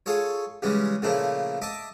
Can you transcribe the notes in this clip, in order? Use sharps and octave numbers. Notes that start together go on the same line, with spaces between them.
F4 G#4 A4 C#5
C#3 E3 G3 G#3 C#4
A#2 C#3 F3 A3 A#3 E4
D#5 E5 A5 D6